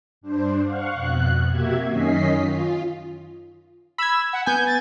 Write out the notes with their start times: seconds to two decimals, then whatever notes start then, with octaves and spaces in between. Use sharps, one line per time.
0.21 G2 D4 C5
0.63 F5 F#5 C#6
0.92 F2 B2 F#6
1.48 C3 A#3 F#4 G4 E5 G#6
1.86 F#2 D#3 C#4 D#5 B6 C7
2.38 F4
3.98 B5 E6 G#6
4.33 F#5
4.46 B3 G#5 G6
4.66 A6